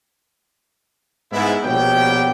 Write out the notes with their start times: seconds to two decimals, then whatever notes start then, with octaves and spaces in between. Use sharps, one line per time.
1.32 G#2 B3 E4
1.64 A#1 B2 B3 G4 C#5 G5